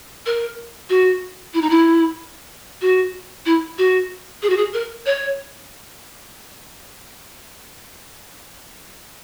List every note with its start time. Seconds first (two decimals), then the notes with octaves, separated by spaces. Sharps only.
0.26 A#4
0.90 F#4
1.54 E4
1.62 D#4
1.70 E4
2.82 F#4
3.46 E4
3.78 F#4
4.42 G#4
4.49 F#4
4.57 G#4
4.74 A#4
5.06 C#5